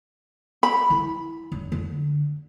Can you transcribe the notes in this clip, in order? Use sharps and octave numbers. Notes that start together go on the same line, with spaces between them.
B5
E4
F1
D3